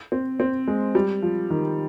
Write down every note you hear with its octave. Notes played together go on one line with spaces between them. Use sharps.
C4
C4
G#3
G3
F3
D#3